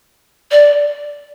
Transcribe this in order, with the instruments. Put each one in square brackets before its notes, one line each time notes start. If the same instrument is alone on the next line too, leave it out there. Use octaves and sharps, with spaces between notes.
[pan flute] D5